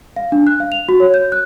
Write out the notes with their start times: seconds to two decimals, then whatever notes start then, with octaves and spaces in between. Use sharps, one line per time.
0.16 F5
0.32 D4
0.47 F#6
0.60 F5
0.72 F7
0.89 F#4
1.00 C#5
1.14 G6
1.32 F#6